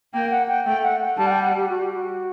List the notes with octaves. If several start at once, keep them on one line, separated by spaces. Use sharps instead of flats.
A#3 G5
F#5
G5
A3 G5
F#5
G3 A5
F#5
G5
F#5
G4
F#4
G4
F#4